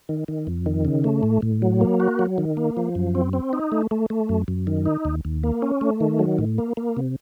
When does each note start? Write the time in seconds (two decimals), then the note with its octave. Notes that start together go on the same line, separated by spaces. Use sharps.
0.09 D#3
0.28 D#3
0.47 F2
0.66 D#3
0.85 C#3
1.04 A3
1.23 A2
1.42 A2
1.62 F#3
1.81 A#3
2.00 F#4
2.19 F#3
2.38 D#3
2.57 A#3
2.77 F3
2.95 F#2
3.15 C4
3.33 C4
3.53 D#4
3.72 A3
3.91 A3
4.10 A3
4.29 F#2
4.48 F#2
4.67 D#3
4.85 D#4
5.05 D#2
5.25 D#2
5.43 A#3
5.62 C#4
5.81 A3
6.01 D#3
6.19 F#3
6.38 A2
6.58 A#3
6.77 A#3
6.97 C3